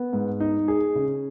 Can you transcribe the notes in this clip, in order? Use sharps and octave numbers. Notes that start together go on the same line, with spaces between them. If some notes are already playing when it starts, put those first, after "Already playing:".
Already playing: B3
G#2
D#4
G#4
C#3